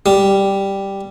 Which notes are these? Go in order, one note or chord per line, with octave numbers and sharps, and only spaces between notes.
G3